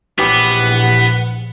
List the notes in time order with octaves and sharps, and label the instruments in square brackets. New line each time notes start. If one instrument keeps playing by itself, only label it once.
[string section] A#1 F#5 [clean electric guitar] E3 G4 [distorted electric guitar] B3